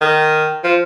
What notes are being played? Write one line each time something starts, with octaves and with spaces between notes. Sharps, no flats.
D#3
F3